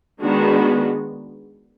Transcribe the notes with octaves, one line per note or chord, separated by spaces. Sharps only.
D#3 G#3 B3 D4 F#4